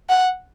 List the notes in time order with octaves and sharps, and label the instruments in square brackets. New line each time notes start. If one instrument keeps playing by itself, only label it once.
[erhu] F#5